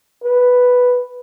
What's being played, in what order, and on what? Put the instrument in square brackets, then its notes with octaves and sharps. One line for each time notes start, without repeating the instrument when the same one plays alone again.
[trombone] B4